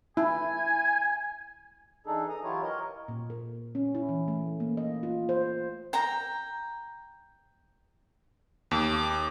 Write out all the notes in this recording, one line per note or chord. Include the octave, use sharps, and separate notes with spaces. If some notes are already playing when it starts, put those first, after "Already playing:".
E4 G#5
E3 D4 D#4 G#4 A4
A#5 D#6
E3 F#3 E4 F4 G4 C#5
A#4 C#5 D#5
A#2
A#4
C#4
E4
E3
A3
A#3
D#5
F4
C5
G5 A#5
D#2 D6